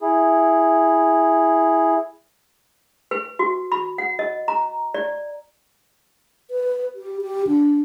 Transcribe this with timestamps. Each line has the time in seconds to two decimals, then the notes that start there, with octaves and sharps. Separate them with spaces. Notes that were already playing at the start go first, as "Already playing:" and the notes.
0.01 E4 G#4
3.11 B4
3.39 F#4
3.72 B5
3.98 F#5
4.19 D#5
4.48 A#5
4.94 D5
6.51 B4
6.95 G4
7.22 G4
7.47 D4